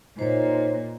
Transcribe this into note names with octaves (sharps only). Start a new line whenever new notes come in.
A#2 D#4 C5 C#5